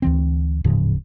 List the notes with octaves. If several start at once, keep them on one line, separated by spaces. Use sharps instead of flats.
D2 E3 C4
D1 G#2 C#3 F3